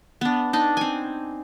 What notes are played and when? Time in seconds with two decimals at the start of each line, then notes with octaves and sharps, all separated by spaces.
0.21 B3 D4
0.53 D4 D#4
0.77 C4 G#5